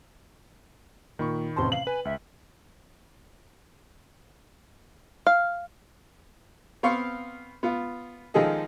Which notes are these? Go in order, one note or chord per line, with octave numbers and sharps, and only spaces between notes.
A#2 D#3 B5 C#6
A1 C3 A5 C6
F5 F#7
B4 G#5
C#2 E5
F5
B3 C4 F5 C6 C#6
B3 F4
D#3 F3 G#3 G#4 A4 D#5